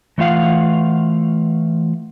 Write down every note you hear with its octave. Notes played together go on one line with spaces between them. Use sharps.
E3 A3 F4 F5 F#5